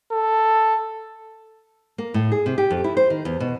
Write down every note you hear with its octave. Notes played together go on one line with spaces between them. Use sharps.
A4
A#3
A2
G#4
C3
G4
F2
E4
C5
D#3
E2
B2